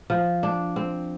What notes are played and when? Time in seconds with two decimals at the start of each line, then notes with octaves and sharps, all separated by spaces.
0.10 F3
0.43 D4
0.76 C4